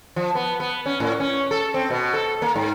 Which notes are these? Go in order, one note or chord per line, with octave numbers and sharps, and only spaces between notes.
F3
B3
B3
C#4
A2
C#4
A4
C4
B2
A4
A#3
G#2